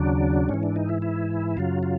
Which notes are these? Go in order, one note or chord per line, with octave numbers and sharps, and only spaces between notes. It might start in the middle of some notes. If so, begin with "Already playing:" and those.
Already playing: D#2 C#3 F#3 D4
G#2 E3 C#4
D4
D#4
E4
E4
F#2 C#3 F#3 F4
F4